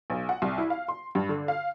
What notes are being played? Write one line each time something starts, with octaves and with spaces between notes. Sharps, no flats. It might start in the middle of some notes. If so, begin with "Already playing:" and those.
B1
F#5
C2
E4
F5
C6
G2
D3
F5